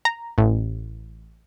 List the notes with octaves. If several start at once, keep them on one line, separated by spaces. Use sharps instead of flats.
A#5
A1